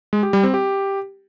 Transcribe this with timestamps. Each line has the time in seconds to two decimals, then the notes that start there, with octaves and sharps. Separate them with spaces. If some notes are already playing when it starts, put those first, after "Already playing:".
0.13 G#3
0.23 G4
0.33 G3
0.43 C4
0.54 G4